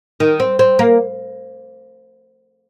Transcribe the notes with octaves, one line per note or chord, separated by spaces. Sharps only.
D#3
C4
C4
A#3